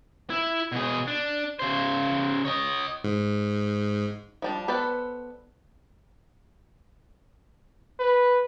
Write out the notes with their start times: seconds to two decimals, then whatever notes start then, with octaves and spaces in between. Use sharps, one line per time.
0.30 E4
0.72 B2 G#4
1.07 D4
1.59 C#3 C5
2.45 C#5 D#5
3.04 G#2
4.42 F3 G3 D4
4.68 B3 A4 B4 C5 D5
8.00 B4